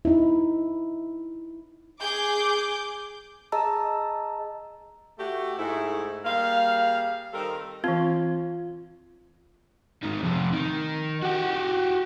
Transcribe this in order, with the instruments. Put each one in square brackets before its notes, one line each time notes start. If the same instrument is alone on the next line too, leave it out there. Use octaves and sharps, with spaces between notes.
[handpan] D#4 E4
[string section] G#4 D6 G6
[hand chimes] G#4 D#5 A5 A#5 E6
[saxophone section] A3 F#4 G4
G#2 A3 E4
G3 A#3 G#4 F5
D#3 G3 C4 D#4 A4 A#4
[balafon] E3 C4 [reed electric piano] F4
[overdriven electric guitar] G#2 D#3
F2 C3
D#3
F#4 G4